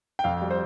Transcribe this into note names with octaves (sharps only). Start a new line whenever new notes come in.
G5
F2 F5
G3
C5